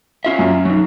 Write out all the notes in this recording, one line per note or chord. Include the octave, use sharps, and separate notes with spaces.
C#4 F4 E5
F#2
F#3 D#4